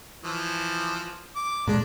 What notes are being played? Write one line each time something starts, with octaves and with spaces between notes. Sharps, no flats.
E3 F3
D6
A#2 G#3 D4